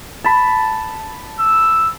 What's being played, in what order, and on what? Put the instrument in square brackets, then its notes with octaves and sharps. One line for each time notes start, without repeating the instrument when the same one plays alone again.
[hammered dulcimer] A5 B5
[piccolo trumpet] E6